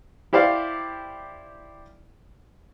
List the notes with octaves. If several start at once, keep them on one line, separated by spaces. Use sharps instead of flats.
E4 G4 C5 D5 F5